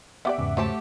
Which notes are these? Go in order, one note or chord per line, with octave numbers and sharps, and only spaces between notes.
B3 G4 D5 E5 F#5 D6
E2 G#2 C#3
F#3 A3 G4 C5 A5